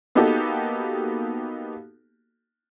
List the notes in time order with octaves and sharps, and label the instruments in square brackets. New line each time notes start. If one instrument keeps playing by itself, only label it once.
[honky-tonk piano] A#3 B3 D#4 F#4 G4 A4